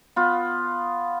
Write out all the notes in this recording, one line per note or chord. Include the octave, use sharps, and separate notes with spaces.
B3 F4